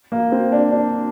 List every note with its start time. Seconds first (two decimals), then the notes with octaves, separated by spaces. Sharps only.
0.12 A#3
0.32 C4
0.52 D4
0.71 D4